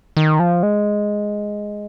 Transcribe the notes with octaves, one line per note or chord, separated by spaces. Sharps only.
D#3
F3
G#3